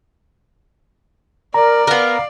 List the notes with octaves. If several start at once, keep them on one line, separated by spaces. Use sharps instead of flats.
A#4 D5 A#5
B3 A#4 F5